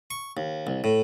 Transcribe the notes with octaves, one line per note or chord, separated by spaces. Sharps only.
C#6
D#2
C2
A2